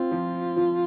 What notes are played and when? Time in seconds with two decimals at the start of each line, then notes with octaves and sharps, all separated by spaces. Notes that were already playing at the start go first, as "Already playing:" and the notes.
Already playing: C4 F4
0.11 F3
0.56 F3